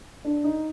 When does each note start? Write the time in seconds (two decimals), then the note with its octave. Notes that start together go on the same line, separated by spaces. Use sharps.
0.25 D4
0.44 D#4